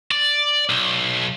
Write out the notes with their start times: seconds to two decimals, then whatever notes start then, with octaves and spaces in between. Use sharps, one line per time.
0.11 D5
0.70 B1